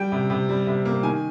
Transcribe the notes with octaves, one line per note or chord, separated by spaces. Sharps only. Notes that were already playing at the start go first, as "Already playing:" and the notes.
Already playing: G3 G5
C3
C3
G3
C3
A#3
D#3 G#5